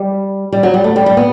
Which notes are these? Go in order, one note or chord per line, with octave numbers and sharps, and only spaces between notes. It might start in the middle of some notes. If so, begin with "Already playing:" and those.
Already playing: G3
G3
F#3
G3
A3
G3
G3
B3